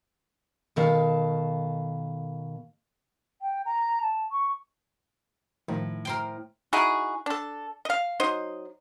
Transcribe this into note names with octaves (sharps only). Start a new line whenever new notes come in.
B2 D#3 A4 F5
G5
A#5
A5
C#6
A2 D#3 F3
A#4 C5 G5
D#4 E4 F#4 G#4
D4 A4
D#5 F5
F#3 D#4 C5 D#5